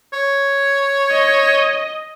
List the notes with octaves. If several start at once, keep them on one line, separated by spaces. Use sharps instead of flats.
C#5
D#5